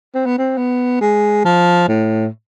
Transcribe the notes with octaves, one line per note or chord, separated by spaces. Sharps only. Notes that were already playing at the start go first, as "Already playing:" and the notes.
C4
B3
C4
B3
G#3
F3
A2